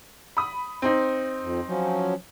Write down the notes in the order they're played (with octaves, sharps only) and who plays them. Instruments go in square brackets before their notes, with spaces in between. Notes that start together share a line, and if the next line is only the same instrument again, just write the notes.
[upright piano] B5 D#6
C4 D#4
[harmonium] F2
F3 F#3 C#4